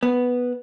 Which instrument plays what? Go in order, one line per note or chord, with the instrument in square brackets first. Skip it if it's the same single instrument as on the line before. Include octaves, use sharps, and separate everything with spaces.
[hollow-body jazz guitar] B3